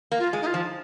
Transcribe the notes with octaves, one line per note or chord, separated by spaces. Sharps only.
A#3
F4
G#3
D#4
F4
F3